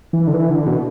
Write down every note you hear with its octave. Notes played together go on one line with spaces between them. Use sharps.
E3
D3
E3
D3
B2